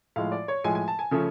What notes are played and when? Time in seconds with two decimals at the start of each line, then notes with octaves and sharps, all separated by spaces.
0.16 A2 F3 G#3 F5
0.32 D5
0.48 C#5
0.64 A2 F3 G#3 G#5
0.75 G#5
0.88 A5
0.99 G#5
1.11 C#3 F3 A3 C#4